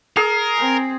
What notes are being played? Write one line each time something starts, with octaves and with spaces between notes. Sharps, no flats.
G#4 A#4
C4